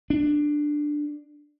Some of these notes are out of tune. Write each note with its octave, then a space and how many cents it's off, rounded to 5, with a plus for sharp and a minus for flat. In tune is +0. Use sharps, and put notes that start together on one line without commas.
D4 +10